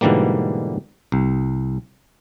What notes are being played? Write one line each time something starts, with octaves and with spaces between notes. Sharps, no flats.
G#2 B2 D3 E3 G3 A#3
C2